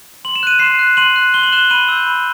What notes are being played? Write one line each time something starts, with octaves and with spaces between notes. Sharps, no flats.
C6 F#7
E7
F#6 D#7
C6 C7 E7
F#6
C6 D#7 F#7
F#6
C6 G7
F#7
F#6 E7 G7
B5 D#7 F#7
E6 G6
B5